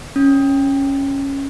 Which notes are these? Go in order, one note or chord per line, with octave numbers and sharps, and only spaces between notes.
C#4